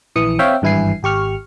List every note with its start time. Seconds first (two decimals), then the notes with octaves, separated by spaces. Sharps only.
0.16 A#1 E3 D#6 C#7
0.39 C4 C#5 E5 F5 G5
0.62 G#1 G2 E3 E4 G#5 C7
1.03 G#1 G4 C#6 F6